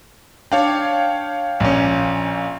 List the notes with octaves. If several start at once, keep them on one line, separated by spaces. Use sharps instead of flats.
D4 C#5 F5 G5
A#1 C#4